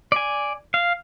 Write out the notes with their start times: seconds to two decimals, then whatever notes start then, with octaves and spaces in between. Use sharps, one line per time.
0.12 D5 G#5
0.74 F5